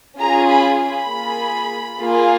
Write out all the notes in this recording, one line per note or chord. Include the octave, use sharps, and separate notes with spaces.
C#4 F4 G#4 A#5
B5
B5
A#3 F4 G#4
A#3 F4 G#4